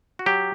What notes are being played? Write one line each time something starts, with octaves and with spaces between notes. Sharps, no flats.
F#4
F#3 G4